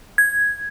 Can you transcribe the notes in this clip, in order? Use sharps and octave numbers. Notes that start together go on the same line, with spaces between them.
G#6